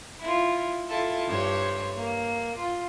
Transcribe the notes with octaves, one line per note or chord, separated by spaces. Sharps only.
E4 F4
E4 F4 A4
G2 C5 C#5
A#3
F4